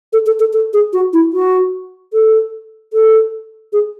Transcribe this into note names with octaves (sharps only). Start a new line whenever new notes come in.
A4
A4
A4
A4
G#4
F#4
E4
F#4
A4
A4
G#4